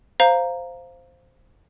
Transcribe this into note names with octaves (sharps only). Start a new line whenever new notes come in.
C5 F5 A#5